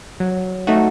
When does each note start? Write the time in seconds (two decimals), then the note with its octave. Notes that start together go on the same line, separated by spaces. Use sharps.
0.20 F#3
0.67 A3 D#4 F#4